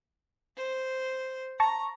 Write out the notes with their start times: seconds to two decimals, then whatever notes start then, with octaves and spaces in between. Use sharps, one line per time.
0.57 C5
1.60 A5 A#5 C#6 A#6